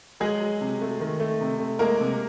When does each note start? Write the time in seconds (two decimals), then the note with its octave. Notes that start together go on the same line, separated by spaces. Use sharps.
0.20 F#3 G#3 G#4
0.40 F#3
0.61 C3
0.81 A3
1.00 D#3
1.20 A3
1.41 C3
1.60 A3
1.79 G#3 A#3 A#4
2.00 C3